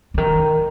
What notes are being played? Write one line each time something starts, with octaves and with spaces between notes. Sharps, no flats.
D3
D#3